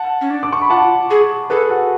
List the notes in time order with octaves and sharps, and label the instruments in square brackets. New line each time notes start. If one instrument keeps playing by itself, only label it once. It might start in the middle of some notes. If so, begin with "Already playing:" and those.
Already playing: [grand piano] F#5 A5
[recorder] C#4
D4
[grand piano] D6
C#6
B5
[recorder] F4 [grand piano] F#5 A5
[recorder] G#4
[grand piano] G#4 B4 [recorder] A4
[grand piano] F#4 A4